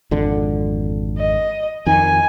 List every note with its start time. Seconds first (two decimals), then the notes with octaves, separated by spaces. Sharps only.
0.11 G#1 F2 D3
1.18 D#5
1.87 F2 D#3 G#5